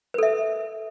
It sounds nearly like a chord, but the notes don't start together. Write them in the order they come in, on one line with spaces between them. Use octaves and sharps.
B4 A4 E5